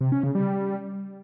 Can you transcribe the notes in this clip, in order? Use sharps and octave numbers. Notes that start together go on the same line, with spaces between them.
C3
C#4
C#3
G3